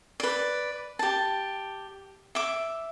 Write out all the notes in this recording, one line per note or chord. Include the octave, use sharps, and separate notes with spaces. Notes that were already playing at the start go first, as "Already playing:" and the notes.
B4 D5
G4 A5
E5 D6